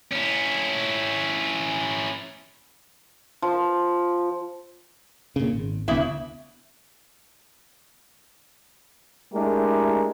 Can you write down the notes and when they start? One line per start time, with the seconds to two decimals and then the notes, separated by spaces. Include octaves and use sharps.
0.13 C#4 E4
3.42 F3
5.36 A#2 C#3
5.52 G#1
5.88 E1 D2 C#3 B3 D4 E4
9.33 G#3 A3 D4 E4 G4 A#4